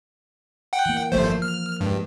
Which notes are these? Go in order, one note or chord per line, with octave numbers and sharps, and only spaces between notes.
F#5 G5
E3 A#3
G1 F3 A3 A#3 C5
F6
G2 G#3